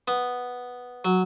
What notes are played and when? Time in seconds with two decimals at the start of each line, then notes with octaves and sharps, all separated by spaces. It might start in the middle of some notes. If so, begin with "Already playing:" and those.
0.08 B3
1.05 F#3